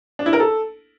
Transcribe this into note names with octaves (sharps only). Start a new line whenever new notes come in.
D4
E4
A#4
A4